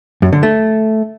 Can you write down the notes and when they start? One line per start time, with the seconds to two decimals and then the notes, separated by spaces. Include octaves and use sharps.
0.22 F#2
0.33 D3
0.43 A3